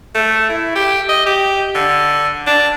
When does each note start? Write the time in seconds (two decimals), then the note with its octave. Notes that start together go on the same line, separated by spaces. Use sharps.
0.15 A3
0.49 E4
0.76 G4
1.09 D#5
1.26 G4
1.75 D3
2.47 D4